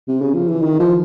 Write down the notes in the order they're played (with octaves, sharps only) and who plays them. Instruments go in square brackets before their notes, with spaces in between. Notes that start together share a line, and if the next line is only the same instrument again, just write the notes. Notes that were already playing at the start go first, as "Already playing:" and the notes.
[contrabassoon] C3
C#3
F3
E3
D#3
F3